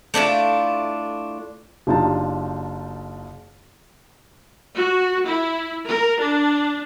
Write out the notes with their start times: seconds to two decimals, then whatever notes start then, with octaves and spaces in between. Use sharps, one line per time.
0.14 A3 D4 E4 F4
1.87 F#1 D4 D#4 F4 G4 A5
4.75 F#4
5.26 E4
5.87 A#4
6.20 D4